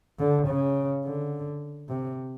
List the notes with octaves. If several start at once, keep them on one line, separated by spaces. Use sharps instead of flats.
D3
C#3
D3
C3